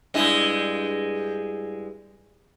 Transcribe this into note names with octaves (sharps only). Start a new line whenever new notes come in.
G2 G#3 E4